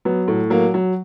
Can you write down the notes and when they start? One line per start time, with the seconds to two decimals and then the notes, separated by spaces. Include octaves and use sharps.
0.05 F#3 B3
0.28 A2
0.50 F#3 A#3
0.74 F#3